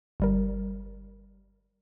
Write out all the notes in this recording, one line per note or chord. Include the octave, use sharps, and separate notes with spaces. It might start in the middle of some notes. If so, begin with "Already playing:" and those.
G1 G3 A#4